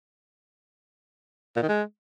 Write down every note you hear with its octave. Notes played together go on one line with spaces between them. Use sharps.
A#2
D#3
G#3